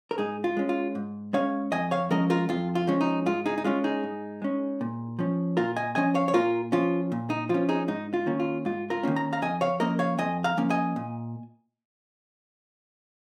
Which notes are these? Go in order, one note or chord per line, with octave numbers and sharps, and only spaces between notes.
A#4
G#2 D#4 G#4
F4
G#3 C#4
F4
G#2
G#3 C#4 C#5 F5
F2 D#5 G#5
C#5 F5
F3 G#3 C#4 A#4 D#5
F4 A#4
F2 F4
F4
F3 G#3 C#4
D#4
G#2 F4
D#4 G#4
D#4
G#3 C#4 F4
D#4 G#4
G#2
G#3 C#4
A#2
F3 C#4
A#2 F4 A#4
D#5 G#5
F3 C#4 D#5 G#5
C#5 F5
C#5
A#2 F4 A#4
F3 C#4 F4
A#2
D#4
F3 C#4 F4
D#4 G#4
G#2 D#4
F4
D#3 A#3 C#4
F4
G#2 F4
F4 A#4
D#3 A#3 C#4
A#5
F5 A#5
F2 D#5 G#5
C#5 F5
F3 A#3 C#4 A#4 D#5
C#5 F5
F2 D#5 G#5
F5 A#5
F3 A#3 C#4
D#5 G#5
A#2